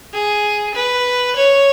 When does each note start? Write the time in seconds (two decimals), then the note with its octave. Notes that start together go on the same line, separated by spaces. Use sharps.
0.13 G#4
0.74 B4
1.36 C#5